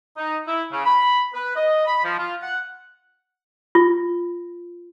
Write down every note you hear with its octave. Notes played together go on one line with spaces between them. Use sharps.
D#4
E4
C#3
B5
B4
D#5
B5
F3
F4
F#5
F4